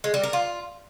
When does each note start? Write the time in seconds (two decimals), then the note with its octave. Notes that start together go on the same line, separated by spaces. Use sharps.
0.04 G#3
0.14 G3
0.23 A#4
0.33 F4